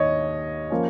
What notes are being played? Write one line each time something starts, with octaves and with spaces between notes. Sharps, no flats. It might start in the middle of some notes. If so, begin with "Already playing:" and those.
Already playing: D#2 D#3 C#5 D#5
F3 A#3 C#4